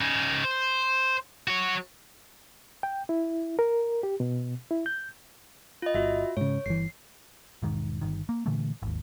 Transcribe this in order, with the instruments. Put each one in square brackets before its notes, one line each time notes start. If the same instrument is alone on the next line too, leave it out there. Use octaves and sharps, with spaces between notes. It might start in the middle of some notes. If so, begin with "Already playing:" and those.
[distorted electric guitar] C#3 D#4
C5
F#4 C#5
[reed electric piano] G5
E4
A#4
G4
B2
E4
G6
[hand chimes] F4 D#5
[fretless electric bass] G1 [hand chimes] F4 F#4 E5
[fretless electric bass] G#2 C#3 [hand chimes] C#5
[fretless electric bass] G1 E3 [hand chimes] C7
[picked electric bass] E1 G#2 D#3
G1 D#3
A#3
A#2 D3 E3 A3
G#1 D#2